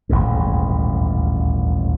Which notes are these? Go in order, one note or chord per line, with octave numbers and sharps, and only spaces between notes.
D#1 A1 D2 G#2